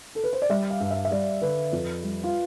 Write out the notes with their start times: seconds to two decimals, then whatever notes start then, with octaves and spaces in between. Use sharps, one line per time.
0.15 A4
0.24 B4
0.33 C5
0.42 D5
0.50 G3 E5
0.70 F5
0.81 G2
0.91 E5
1.05 E5
1.11 G3 D5
1.41 D3 B4
1.73 F2
2.03 G3
2.24 F4